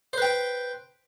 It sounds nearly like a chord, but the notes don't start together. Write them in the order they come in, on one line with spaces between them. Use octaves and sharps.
C5 B4 G5